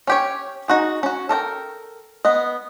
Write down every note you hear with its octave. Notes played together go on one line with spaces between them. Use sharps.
C#4 G4 C#5
D#4 F#4 G#4
C#4 F#4
A4 A#4 D5 G5
B3 D#5